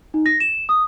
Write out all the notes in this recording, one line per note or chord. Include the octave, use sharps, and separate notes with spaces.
D#4
A#6
E7
D#6